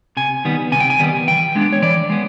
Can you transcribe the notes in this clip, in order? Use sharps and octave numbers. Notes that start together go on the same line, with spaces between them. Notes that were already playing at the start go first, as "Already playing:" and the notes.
C3 G#5
D#3 G3 B3
C3 G#5
G5
G#5
D#3 G3 B3
E3 G5
G#3 B3 D4
C#5
E3 D5
G#3 B3